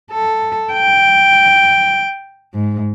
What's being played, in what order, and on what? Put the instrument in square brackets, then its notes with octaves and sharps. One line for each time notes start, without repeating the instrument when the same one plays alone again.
[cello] A4
G5
G#2